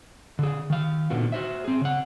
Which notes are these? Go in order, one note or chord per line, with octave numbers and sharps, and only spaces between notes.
D3 G#4
D#3 F5
A#2 D3 D#3 B3 F#4
F#4 C5 E5
C4 G#4
C#3 F#5